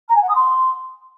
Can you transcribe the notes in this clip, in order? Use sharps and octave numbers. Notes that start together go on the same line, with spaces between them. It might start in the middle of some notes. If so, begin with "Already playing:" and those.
A#5
G#5
F#5
D#6
C6